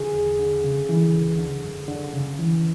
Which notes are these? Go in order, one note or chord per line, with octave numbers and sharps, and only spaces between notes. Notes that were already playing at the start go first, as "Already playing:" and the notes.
Already playing: D3 G#4
E2
D3
C#3
E3
C#2
D3
F#2
D3
C#3
E3